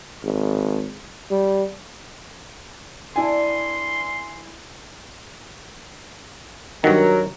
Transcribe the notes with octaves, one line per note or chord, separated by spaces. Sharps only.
G#1
G3
B3 D4 E4 G#5 C6
G2 D#3 F#3 A#4